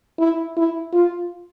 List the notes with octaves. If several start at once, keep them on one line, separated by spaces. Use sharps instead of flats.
E4
E4
F4